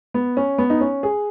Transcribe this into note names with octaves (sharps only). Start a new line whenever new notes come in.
B3
C#4
B3
D#4
C#4
G#4